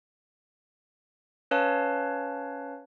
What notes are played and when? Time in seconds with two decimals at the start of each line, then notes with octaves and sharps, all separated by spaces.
1.51 C#4 B4 C#5 F5 A5